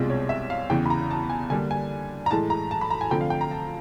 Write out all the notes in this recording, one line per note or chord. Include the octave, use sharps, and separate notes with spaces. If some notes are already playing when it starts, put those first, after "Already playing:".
Already playing: C2 B2 G#3 C4 F4
C#5
E5
F5
E2 C#3 E3 G5
B5
A#5
A5
G#5
D3 G3 A#3 D4 G#5
G#5
A#5
A2 E3 G#3 A5
A#5
A5
B5
A#5
G#5
D3 F3 A3 C4 G5
F5
G5
A#5
A5